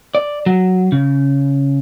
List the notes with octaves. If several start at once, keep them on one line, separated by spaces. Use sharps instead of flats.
D5
F#3
C#3